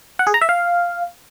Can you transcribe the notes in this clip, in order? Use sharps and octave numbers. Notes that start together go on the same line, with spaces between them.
F#5
G#4
A#5
E5
F5